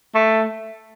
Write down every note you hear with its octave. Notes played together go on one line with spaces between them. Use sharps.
A3